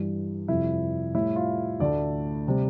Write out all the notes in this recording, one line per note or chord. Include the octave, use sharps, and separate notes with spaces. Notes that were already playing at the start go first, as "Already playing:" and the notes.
Already playing: G2 E3 G3
F2 C3 G3 E4
A2 G3 E4
F4
D2 D3 A3 D5
C3 G3